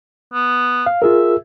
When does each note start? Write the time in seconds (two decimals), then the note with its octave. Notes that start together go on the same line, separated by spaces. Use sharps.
0.33 B3
0.86 F5
1.02 F4 G#4 A#4 E5